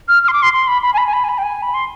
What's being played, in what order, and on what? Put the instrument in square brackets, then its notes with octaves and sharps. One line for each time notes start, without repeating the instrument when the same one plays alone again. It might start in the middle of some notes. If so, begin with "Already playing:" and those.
[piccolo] F6
F6
C6
D6
C6
C6
B5
B5
G#5
B5
G#5
B5
G#5
B5
G5
G#5
B5
C6